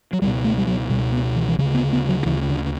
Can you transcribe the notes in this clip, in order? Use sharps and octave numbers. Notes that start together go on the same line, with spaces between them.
F#3
C#2 B2 G3
A3
G3
F#3
C#2 B2 G3
B3
E3
E3
D2 C#3 F#3
B3
B3
F#3
D2 C#3 E3
D3